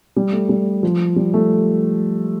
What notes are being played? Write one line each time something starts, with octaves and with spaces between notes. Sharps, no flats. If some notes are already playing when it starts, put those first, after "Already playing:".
G3
A3
G3
F3
G3
A3